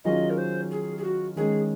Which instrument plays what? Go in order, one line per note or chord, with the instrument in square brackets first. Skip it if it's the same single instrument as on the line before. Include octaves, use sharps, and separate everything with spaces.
[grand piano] D#3 F#3 C#4 F4 G#4 [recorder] D#5
[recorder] A#4
C5
G#4
G#4
F#4
[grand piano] D#3 G#3 C#4 [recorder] G#4